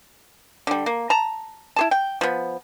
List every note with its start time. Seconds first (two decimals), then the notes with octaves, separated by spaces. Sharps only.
0.67 D3 G3
0.86 A#3
1.10 A5 A#5
1.76 E4 G#4 A5
1.91 G5
2.21 F3 B3